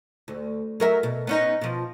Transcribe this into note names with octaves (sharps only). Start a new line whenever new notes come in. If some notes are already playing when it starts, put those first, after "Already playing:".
D2
F#3 A#4 E5
B2
B3 C#4 D#4
B2 F3